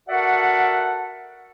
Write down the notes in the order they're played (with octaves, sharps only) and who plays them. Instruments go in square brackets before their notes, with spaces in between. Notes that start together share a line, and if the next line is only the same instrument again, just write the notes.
[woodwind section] F#4 A4 A#4 D5 E5 F#5